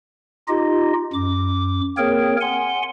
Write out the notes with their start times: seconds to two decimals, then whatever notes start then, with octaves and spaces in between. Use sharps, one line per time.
0.48 D#4 F4 G4 D#5
1.13 F#2 D6
1.97 A#3 C4 G#4 A#4 C#5 G5
2.41 F#5 G#5 C6